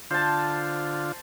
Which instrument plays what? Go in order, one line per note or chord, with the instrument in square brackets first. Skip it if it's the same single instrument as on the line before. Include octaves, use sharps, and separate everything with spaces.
[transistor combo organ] D3 F4 [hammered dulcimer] C5 A5